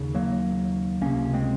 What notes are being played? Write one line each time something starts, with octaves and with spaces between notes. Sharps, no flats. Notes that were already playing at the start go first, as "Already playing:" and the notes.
Already playing: D#2 C#3
F#3 A#3
C#2 C3 A#3 C#4
G#3 C4